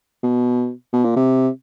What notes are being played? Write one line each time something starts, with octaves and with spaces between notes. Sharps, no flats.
B2
B2
A#2
C3